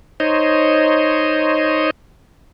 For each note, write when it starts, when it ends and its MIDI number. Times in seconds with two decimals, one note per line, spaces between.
0.20 1.91 63
0.20 1.91 72
0.20 1.91 73
0.20 1.91 75